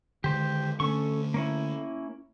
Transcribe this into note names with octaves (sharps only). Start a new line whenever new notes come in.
D3 D#3 G#3 G4 C5
D3 A3 C#4 A4 C#6
A#3 C#4 E4